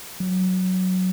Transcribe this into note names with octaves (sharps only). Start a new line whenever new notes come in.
F#3